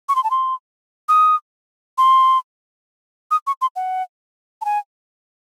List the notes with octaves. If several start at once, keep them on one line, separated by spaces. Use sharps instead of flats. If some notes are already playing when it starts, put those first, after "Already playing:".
C#6
C6
A5
C6
D#6
C6
D#6
C#6
C6
F#5
A5
G#5